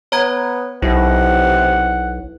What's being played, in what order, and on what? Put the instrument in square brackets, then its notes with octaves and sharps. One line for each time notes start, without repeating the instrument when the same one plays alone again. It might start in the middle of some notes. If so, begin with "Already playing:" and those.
[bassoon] B3 [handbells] C#5 A#5 G#6
[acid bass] B1 [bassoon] C3 [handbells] E4 [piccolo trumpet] F#5